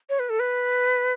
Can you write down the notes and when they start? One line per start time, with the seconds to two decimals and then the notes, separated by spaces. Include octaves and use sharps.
0.09 C#5
0.19 B4
0.30 A4
0.40 B4